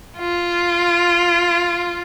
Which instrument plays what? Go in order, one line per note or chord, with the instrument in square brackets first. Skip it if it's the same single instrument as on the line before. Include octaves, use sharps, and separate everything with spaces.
[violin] F4